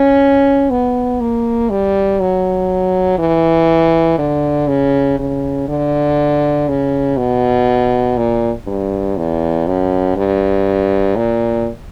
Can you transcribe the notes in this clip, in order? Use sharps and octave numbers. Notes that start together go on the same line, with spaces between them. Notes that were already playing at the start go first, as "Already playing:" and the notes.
Already playing: C#4
B3
A#3
G3
F#3
E3
D3
C#3
C#3
D3
C#3
B2
A#2
G2
E2
F#2
G2
A#2